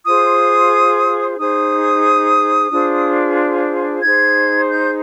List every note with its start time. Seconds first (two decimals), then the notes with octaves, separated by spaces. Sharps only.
0.06 F4 G#4 C5 D#6
1.38 D#4 G#4 C5 D#6
2.71 D4 F4 G#4 C5
4.02 D#4 G#4 C5 G#6
4.69 G6